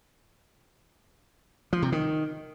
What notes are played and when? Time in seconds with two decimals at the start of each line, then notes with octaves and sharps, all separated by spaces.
1.73 F3
1.82 C3
1.92 D#3